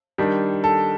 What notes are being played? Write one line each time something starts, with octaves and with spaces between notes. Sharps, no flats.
D#3 G3 D4
A4